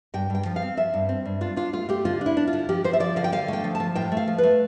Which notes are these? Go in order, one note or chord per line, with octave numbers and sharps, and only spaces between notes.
G2 G5
G2 G5
F3
F5
C4
F3 E5
G2
C4
G2
D4 F4
D4 F4
A3 F4
A3 G4
D3 F4
D4 E4
D4
F4
D3
F3 G4
F3 C5
E5
F3 D5
D3 F5
G5
D3 F5
A3 G5
F3
A5
F3
A2 G5
A3
F5
F3
A3 B4